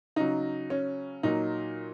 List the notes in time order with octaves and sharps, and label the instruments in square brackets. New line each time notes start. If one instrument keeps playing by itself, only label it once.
[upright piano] C#3 F#3 D#4
C#4
A#2 F#3 D#4